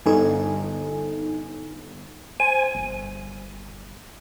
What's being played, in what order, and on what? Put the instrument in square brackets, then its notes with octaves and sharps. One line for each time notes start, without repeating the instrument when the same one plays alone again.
[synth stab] G1 [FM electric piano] D#4 A4 G#5
[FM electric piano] C5 [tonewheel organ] G#5
[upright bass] G1